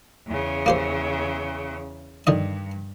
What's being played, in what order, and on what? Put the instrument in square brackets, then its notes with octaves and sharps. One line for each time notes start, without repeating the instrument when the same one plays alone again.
[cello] E2 C#3
[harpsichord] A#3 G4 C5
[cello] G2 [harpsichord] D3 D#3 D#5